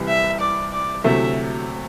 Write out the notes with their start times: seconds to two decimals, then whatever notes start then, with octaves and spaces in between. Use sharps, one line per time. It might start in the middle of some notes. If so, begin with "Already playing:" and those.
Already playing: C2 C3 E3 G3
0.08 E5
0.40 D5
0.72 D5
1.04 D2 C3 F#3 A3 E4 E5